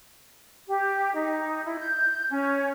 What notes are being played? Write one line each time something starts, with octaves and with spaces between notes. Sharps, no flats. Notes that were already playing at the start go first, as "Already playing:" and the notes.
G4
D#4
E4
G6
C#4